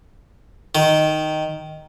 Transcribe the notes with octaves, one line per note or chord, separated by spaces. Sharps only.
D#3